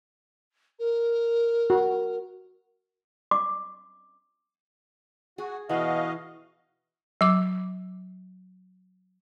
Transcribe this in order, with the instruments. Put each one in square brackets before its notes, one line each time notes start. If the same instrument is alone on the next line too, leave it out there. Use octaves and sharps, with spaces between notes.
[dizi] A#4
[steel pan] F#4
[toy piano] D6
[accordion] F#4 [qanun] G#4
[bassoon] B2 [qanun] E3 E4 [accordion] F#4 D#5 F5
[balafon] F#3 D6